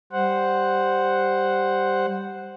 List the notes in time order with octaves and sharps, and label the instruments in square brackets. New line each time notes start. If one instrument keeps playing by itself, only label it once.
[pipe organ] G3 C5 F#5